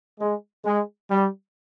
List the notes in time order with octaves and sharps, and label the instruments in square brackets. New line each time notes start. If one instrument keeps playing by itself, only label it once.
[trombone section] G#3
G#3
G3